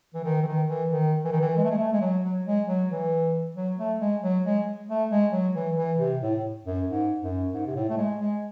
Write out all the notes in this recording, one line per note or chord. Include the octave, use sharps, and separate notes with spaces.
E3
D#3
E3
D#3
E3
D#3
E3
D#3
E3
G#3
A3
G#3
A3
G#3
F#3
F#3
G#3
F#3
E3
F#3
A3
G#3
F#3
G#3
A3
G#3
F#3
E3
E3
C3
A2
F#2
G#2
F#2
G#2
C3
A2
A3
G#3
G#3